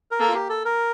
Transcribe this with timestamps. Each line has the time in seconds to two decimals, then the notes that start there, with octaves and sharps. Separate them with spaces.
0.11 A#4
0.20 A#3 A4
0.29 F4
0.34 G4
0.49 A4
0.65 A#4